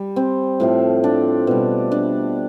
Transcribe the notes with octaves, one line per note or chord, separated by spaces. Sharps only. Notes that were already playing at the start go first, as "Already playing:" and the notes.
Already playing: G3
C4
A2 F3 A3
D4
B2 G3
D4